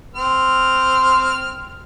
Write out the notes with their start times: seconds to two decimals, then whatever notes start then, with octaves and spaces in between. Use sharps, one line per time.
0.15 C4 C5 F6